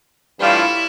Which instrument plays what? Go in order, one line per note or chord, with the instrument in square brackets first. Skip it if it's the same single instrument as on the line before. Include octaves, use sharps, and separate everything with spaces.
[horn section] A2 E3 G3 D4 F4 [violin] E4